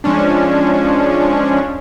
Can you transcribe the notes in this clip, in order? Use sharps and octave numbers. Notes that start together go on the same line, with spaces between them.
F3 G#3 C#4 D4